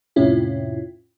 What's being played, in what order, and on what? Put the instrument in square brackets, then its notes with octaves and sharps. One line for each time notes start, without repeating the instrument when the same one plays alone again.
[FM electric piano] F2 A2 C3 C#4 E4 F4